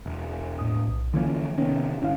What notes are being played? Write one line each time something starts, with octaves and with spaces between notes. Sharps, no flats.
E1
A2 D#6
B1
D3 E3 F3 A#3 C#4
C3 D#3 B3 C#4
G1 C#4 E4 F5